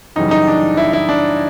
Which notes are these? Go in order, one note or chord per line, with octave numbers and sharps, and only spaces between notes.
F#2 C#3 E3 G3 D#4
D#4
D4
E4
E4
D4